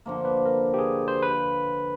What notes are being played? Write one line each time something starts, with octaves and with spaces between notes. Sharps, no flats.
D3 F3 A#3
B4
A#4
G4
G#4
C5
B4